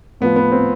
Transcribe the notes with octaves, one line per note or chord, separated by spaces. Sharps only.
A2 F3 B3
B3
C4